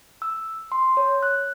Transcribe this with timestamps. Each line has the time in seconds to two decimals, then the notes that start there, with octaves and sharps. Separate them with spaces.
0.22 E6
0.72 C6
0.97 C#5
1.23 F#6